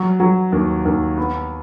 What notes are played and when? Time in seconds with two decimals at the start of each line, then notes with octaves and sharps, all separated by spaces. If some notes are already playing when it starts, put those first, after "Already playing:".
Already playing: F#3
0.20 F#3
0.52 D#2
0.85 D#2
1.18 B3